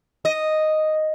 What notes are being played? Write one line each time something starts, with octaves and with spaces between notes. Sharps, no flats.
D#5